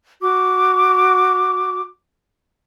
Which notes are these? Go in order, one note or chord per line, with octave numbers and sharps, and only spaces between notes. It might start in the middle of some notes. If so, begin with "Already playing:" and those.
F#4 D6